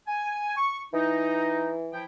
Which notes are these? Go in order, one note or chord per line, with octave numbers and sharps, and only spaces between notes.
G#5
C#6
E3 D#4
F3 E4 G5